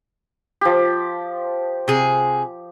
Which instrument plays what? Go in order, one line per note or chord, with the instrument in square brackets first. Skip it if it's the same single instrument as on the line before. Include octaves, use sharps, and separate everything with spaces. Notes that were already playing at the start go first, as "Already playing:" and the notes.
[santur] F3 G4
[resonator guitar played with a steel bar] C3 G#4